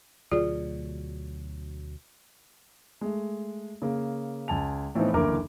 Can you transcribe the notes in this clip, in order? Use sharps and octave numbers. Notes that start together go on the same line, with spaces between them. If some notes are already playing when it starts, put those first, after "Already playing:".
D2 B2 F#3 F4 G#4 D5
G#3 A3
C#3 A#3
C#2 G#5 A5 F7
A2 E3 F3 B3 C4 D#4
F#1 D2 E3 A#3 A#4 D6